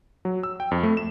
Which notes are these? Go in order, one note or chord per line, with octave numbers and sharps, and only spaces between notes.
F#3
E6
G5
F2
A3
E7